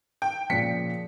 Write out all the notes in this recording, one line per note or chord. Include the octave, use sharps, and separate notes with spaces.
G5
A#2 C#3 F3 B6 C#7